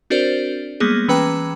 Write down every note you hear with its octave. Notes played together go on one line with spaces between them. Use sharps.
C4 D4 F#4 A#4 C5 D5
G3 G#3 A#3 B3 G#4
E3 C#4 B4 G5 A#5 D6